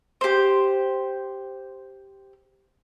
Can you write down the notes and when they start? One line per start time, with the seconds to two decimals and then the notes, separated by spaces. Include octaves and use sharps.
0.21 G4 C5